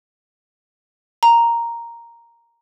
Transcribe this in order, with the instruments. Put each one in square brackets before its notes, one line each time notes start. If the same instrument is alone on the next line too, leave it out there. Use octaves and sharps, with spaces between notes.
[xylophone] A#5